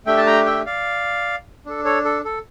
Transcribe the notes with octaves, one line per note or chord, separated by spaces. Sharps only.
A3 D4 G4 E5 G5
A5
G5 A#5
E5 G5
D5 F5
D4 A4
A4 C#5
A4
A4